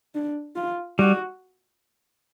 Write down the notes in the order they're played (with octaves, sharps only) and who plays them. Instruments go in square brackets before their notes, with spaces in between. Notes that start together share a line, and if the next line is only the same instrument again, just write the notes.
[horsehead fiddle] D4
F4
[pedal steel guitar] G3 [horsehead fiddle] F#4